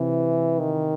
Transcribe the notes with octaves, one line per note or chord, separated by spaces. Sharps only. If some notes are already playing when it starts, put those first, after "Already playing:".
Already playing: C3 E3
D#3